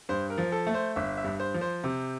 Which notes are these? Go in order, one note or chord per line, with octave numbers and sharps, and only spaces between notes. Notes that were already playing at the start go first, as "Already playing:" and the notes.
G2 C5
A#4
F3
A4
A3
C5
G1 E5
E5
G2
C5
F3
C5
C3